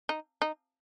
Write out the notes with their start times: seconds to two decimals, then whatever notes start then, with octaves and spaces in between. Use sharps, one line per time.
0.09 D#4
0.42 D#4